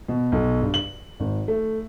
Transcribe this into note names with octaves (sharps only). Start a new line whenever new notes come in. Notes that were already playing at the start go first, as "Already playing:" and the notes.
B2
B1
G2
F#7
G#1
A3